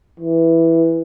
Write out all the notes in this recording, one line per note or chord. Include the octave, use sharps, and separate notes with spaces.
E3